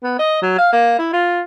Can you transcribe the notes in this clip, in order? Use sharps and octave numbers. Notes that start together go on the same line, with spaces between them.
B3
D#5
F#3
F5
A#3
E4
F4